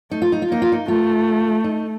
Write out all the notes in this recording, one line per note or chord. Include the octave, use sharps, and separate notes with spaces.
A3 D#4
F4
D#4
F4
A#3 D#4
F4
D#4
A3 F4
D#4